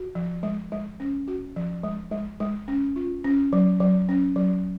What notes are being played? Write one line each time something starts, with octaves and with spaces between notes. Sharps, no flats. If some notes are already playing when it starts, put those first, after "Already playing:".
Already playing: F#4
F3
G#3
G#3
C#4
F#4
F3
G#3
G#3
G#3
C#4
F4
C#4
F#3
F#3
C#4
F#3